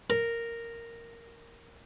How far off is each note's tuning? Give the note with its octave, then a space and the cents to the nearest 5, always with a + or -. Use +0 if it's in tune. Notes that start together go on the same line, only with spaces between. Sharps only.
A#4 -5